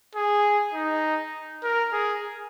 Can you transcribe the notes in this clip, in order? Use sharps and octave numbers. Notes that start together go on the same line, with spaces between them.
G#4
D#4
A#4
G#4